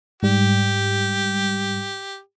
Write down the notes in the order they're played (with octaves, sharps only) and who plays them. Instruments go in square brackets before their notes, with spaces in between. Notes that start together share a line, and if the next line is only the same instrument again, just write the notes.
[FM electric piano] G#2 G3 [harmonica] G4